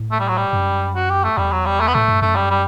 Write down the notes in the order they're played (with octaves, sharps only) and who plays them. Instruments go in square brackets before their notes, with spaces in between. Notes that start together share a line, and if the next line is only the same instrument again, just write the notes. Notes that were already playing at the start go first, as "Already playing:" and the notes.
Already playing: [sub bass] A2
[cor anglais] A3
G3
F#3
G3
[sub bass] F#2
[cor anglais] F#4
G4
A3
[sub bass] E2 [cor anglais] G3
[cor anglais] F#3
G3
A3
B3
[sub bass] A2 [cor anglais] A3
[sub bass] G2
[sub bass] F#2 [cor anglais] A3
[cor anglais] G3
G3